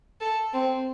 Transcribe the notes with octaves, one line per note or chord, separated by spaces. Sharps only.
A4
C4